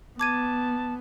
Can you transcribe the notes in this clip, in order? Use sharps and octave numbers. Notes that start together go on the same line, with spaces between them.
B3 A5 D6 G#6 D#7